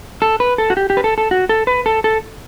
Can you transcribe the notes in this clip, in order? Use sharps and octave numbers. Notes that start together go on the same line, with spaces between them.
A4
B4
A4
F#4
G4
G4
B4
A4
A4
F#4
A4
B4
A4
A4